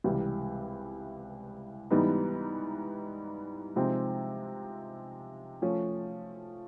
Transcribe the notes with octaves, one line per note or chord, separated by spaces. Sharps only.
C#2 C3 E3 G3
G#2 E3 G3 B3 D#4
C3 F3 G#3 C4 D#4
F3 A3 C#4